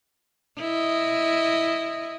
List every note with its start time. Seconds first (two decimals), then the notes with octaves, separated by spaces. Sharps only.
0.61 E4 D#5